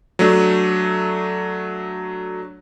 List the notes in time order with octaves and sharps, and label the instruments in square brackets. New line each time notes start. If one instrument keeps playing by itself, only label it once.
[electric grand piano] F#3 A3 D4